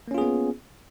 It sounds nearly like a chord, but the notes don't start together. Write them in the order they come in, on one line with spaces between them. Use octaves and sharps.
A#3 C#4 F4 G#4 B3